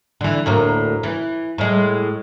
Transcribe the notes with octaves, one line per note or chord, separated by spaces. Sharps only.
D3 E3
D2 A2 A#3
E3
A2 G#3